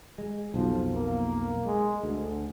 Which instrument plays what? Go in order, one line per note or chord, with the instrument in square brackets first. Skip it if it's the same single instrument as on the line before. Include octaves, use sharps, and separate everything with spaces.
[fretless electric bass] G#3
[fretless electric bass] B1 F2 [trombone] F3
[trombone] A#3
G#3
[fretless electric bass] D2 [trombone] D3